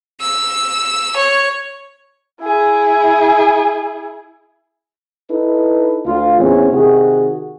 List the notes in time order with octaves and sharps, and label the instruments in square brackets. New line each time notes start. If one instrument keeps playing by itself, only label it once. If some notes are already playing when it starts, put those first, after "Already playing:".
[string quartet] E6
C#5
[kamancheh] E4 G#4
[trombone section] D#4 E4 A4 B4
D2 F4
E2 A2 C4 C#4
C3 D#3 F#4 G#4